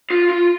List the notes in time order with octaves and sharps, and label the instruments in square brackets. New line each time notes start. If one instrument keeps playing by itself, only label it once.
[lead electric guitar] F4
F4